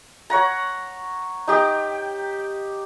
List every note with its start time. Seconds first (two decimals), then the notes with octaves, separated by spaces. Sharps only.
0.30 C#5 F#5 A#5
1.48 D#4 G4 G5